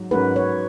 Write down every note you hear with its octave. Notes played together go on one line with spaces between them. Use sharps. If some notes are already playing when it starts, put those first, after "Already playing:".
Already playing: G#2 F#3
G#2 F#3 C#4 F#4 A#4 B4
C#5